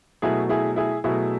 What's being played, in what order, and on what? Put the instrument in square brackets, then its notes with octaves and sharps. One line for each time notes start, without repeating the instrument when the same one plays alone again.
[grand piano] B2 F#3 A3 E4 G#4
E4 G#4
E4 G#4
B2 F#3 A3 E4 G#4